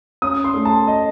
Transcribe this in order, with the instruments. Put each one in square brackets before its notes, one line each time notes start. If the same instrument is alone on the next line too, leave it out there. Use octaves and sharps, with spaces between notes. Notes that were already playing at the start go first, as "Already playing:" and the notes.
[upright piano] C#4 D#6
C6
A3
A5
D#5